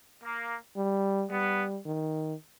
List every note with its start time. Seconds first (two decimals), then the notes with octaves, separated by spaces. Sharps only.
0.23 A#3
0.76 G3
1.30 G3 B3
1.85 D#3